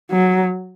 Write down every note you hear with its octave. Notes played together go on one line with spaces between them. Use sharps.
F#3